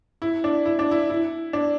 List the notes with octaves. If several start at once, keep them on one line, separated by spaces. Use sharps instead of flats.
E4
D4
E4
D4
E4
E4
D4